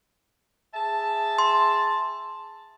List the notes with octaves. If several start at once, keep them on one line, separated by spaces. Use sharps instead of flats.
G#4 E5 A5
C6